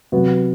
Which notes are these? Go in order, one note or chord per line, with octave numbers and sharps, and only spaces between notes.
C3 F#3 B3 F#4